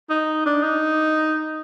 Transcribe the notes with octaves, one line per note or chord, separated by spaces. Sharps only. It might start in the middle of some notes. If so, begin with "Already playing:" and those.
D#4
D4
D#4